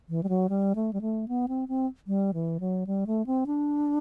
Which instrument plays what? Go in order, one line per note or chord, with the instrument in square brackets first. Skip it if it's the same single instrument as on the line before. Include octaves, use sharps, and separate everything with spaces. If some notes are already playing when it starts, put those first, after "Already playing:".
[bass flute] E3
G3
F#3
G3
A3
G3
A3
B3
C4
C4
G3
E3
F#3
G3
A3
C4
D4